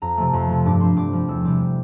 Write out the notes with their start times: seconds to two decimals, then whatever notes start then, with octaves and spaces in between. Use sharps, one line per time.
0.02 F2 A#5
0.17 C3 F3 A3
0.33 F2 C6
0.49 C3 F3 A3
0.66 G2 D6
0.81 F3 C4 C6
0.97 G2 D6
1.13 F3 C4
1.28 E2 E6
1.45 C3 G3 C4 D6